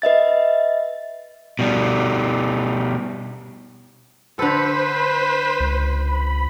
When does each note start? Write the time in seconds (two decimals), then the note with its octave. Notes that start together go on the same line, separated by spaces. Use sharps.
0.02 B4 D#5 E5 A6
1.59 B2 G3
4.39 D3 A4 B4 C5 B6
5.60 C#2
6.07 B5